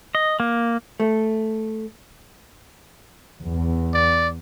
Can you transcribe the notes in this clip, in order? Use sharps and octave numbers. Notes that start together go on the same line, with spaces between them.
D#5
A#3
A3
E2
D5